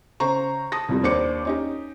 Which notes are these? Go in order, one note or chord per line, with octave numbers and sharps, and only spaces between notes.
C#3 C5 A#5 C#6
A5 D#6 A#6
C2 F2 G3
D#2 D4 C5 D6 C#7
C#4 D#4 G4